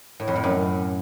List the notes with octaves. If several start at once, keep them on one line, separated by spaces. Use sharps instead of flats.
A2
F2
A2
F#2